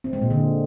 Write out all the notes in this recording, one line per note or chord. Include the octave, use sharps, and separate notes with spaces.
C4
G#3
A#2
D3